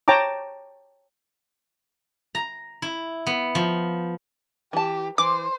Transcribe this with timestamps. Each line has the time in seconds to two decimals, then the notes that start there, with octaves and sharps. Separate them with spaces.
0.08 C#5 G5 A5 A#5 D6
2.35 A#5
2.82 E4
3.27 B3
3.55 F3
4.73 E3 G4 A5
5.18 E3 C5 D6